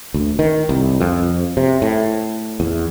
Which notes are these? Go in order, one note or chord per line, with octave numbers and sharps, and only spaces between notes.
D2
D#3
C2
F2
C3
A2
E2